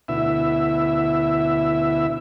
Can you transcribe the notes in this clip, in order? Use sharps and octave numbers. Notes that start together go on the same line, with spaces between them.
D2 B2 E4 E5